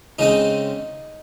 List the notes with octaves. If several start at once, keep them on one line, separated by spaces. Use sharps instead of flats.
C#3 G#3 C4 D#4